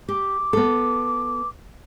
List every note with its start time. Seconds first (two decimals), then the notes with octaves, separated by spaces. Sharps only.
0.08 G4 D6
0.53 B3 A4